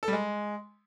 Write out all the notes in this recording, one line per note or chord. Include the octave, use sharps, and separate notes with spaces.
A4
G3
G#3